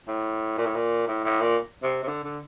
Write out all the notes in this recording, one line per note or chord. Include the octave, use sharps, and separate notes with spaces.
A2
A#2
A2
A#2
A2
A2
A#2
C3
C3
D3
D3